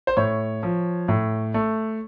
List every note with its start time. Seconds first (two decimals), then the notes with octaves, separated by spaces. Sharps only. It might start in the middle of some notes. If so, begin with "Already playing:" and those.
0.07 C5
0.17 A2 C#5
0.63 F3
1.08 A2
1.54 A3